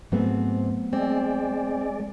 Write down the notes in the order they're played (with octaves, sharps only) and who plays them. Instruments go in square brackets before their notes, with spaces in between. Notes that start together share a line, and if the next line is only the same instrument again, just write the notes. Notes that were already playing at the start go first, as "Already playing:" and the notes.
[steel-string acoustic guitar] G#2 C4 [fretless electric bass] F#3 A3 B3
[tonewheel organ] G#3 D5 [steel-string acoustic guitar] C4